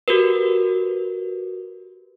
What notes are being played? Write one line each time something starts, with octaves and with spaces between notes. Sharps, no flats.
F#4 G4 A#4 B4